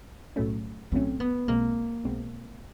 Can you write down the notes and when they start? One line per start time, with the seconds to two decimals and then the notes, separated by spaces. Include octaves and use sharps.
0.36 B1 A2 F#3 A3 C#4
0.92 B1 A2 F#3 A3 C4 C#4
1.20 B3
1.48 B1 B2 G#3 A#3 C4
2.04 B1 B2 G#3 C4